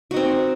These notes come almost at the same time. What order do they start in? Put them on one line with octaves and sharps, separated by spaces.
F#4 D#4 C4